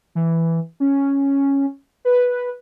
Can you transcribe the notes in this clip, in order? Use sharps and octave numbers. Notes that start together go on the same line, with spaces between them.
E3
C#4
B4